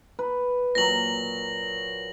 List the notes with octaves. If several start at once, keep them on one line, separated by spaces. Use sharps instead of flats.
B4
A#2 F#3 A#6 F#7